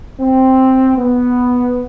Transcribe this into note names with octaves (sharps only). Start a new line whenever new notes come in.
C4
B3